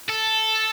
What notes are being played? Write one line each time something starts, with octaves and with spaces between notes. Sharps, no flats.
A4